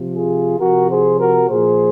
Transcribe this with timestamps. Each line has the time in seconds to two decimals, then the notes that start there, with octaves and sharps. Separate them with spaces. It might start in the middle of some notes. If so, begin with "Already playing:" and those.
Already playing: C3 F3
0.14 F4 G#4
0.59 C3 F3 F#4 A#4
0.89 G#4 C5
1.19 F#4 A#4
1.49 A#2 F3 G#4 C5